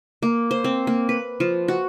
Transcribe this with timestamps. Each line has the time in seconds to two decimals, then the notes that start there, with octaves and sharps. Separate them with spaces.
0.22 A#3
0.51 C5
0.64 C4
0.87 A#3
1.09 B4
1.40 F3
1.68 F#4